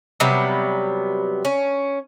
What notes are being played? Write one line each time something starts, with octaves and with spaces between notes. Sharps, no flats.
C3 F#3 G3 B3
C#4